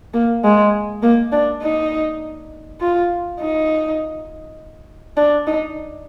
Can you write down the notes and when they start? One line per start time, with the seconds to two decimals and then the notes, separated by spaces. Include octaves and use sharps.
0.14 A#3
0.44 G#3
1.03 A#3
1.32 D4
1.62 D#4
2.81 F4
3.39 D#4
5.17 D4
5.47 D#4